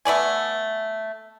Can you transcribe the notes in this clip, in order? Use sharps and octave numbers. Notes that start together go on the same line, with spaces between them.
A3 B3 D5 G#5